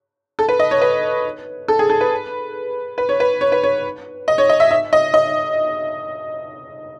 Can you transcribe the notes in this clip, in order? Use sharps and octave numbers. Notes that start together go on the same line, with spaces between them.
A4
B4
D#5
C#5
B4
A4
G#4
A4
B4
B4
C#5
B4
C#5
B4
C#5
D#5
C#5
D#5
E5
E5
D#5
D#5